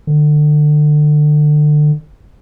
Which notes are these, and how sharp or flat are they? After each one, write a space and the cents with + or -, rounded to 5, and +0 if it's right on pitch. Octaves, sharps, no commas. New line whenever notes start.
D3 +30